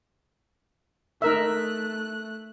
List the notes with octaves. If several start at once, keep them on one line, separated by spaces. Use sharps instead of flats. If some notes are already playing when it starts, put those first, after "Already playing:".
A3 D#4 A#4 E5 F#6